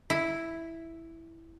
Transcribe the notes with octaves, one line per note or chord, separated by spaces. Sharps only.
E4